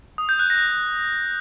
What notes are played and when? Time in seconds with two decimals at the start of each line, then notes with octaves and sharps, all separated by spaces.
0.18 D#6
0.29 G6
0.39 F#6
0.50 A#6